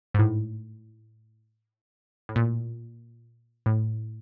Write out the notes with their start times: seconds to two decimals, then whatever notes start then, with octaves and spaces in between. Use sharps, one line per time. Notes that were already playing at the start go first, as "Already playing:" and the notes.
0.14 G#2
0.19 A2
2.29 A2
2.36 A#2
3.66 A2